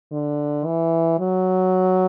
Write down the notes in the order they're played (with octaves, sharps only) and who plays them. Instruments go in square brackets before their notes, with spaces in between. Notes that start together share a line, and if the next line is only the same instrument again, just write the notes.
[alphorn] D3
E3
F#3